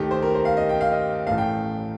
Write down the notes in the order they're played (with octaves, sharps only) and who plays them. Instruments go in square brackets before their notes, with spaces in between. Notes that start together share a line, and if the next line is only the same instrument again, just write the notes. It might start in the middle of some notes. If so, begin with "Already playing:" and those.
Already playing: [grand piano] D#2 D#3 A3 G4
C5
A#4
C5
F5
D#5
G5
F5
D#5
A1 A2 A3 F5
G5